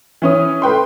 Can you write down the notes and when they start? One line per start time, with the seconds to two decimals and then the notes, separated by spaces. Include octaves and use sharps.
0.22 E3 C#4 D#6
0.62 A3 B4 G5 C6